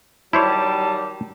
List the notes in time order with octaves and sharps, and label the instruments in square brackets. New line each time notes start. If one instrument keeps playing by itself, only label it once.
[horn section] D#3 F#3 G3 [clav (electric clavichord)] E4 C5 C#5 [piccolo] A5